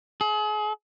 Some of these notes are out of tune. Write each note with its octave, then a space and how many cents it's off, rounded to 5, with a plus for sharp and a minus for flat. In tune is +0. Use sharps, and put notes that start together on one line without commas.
G#4 +35